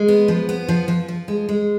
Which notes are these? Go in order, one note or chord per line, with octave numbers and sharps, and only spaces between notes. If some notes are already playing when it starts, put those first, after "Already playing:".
Already playing: G#3
B3
F3
B3
F3
F3
F3
G#3
G#3